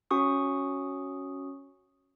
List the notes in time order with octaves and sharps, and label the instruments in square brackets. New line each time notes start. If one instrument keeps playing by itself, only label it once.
[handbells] C#4 F#4 C#6 D#6